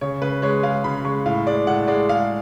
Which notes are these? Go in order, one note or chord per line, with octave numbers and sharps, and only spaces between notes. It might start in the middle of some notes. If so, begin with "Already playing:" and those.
C#3 C#5
C#3 B4
G#3 C#5
G#3 F5
C#3 B5
G#3 C#6
A2 F5
G#3 D5
A2 F#5
G#3 D5
G#3 F5